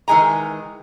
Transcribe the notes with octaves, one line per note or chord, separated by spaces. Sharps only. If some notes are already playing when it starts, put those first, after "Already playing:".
D#3 E3 G#3 G#5 A#5